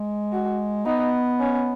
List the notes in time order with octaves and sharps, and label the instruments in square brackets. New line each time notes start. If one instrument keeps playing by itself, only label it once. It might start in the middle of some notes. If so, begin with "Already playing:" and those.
Already playing: [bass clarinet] G#3
[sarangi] F#4
[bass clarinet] B3 [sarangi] D#4
[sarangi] C#4